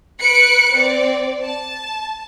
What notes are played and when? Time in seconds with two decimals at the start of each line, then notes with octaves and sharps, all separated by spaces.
0.20 B4 F#6 C#7 D7
0.71 C4 D5
1.42 A5